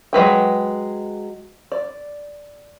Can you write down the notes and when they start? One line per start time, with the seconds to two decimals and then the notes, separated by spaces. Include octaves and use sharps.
0.13 F#3 G#3 B4 G5
1.72 D5